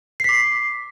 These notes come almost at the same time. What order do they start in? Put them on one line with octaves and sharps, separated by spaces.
C7 B6 D6